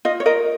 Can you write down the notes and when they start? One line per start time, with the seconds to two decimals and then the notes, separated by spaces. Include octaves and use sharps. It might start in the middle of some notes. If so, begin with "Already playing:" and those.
0.05 F4 D#5
0.20 C#5
0.26 A#4 D#5